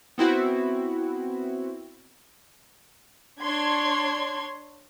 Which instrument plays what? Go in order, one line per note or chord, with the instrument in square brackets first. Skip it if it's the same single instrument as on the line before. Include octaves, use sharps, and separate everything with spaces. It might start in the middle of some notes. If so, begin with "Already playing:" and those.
[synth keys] B3 C4 E4 F#4
[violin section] D4 C#5 C6 G#6